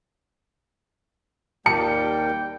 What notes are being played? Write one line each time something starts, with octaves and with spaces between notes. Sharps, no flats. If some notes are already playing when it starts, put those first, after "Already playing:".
D#2 G3 A#3 G5 A5 C#7